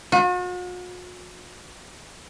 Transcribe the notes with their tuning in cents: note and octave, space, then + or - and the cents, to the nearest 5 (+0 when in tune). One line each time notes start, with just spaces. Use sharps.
F#4 -45